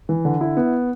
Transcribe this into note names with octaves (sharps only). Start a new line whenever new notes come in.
E3
D3
E4
B3